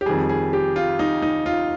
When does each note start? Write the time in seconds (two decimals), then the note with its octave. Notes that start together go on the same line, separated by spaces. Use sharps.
0.01 G4
0.06 F2 D#3 G3 G#4
0.29 G#4
0.53 G4
0.76 F4
0.99 D#4
1.22 D#4
1.46 F4